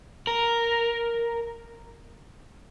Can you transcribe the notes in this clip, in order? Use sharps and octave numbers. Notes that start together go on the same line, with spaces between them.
A#4